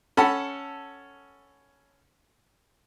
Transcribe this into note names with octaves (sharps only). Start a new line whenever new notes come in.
C#4 A4 F#5 A5 B5